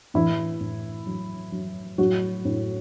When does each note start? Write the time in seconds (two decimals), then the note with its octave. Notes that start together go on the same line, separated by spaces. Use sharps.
0.14 A2 E3 E4
0.60 A2
1.06 F#3
1.52 F#3
1.98 A2 F#3 F#4
2.45 A2